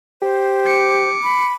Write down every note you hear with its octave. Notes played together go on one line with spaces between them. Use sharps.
G4 C5
D6 C#7
B5